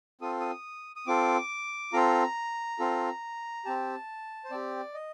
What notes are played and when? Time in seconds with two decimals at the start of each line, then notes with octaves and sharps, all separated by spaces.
0.21 C4 F4 A4 D#6
0.40 D#6
0.96 D#6
1.07 C4 F4 A4 D6
1.93 C4 F4 A4 A#5
2.79 C4 F4 A4
3.65 C4 G4 A5
4.45 C5
4.51 C4 G4 D5
4.94 D#5